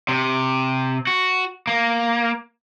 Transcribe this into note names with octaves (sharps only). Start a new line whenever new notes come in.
C3
F#4
A#3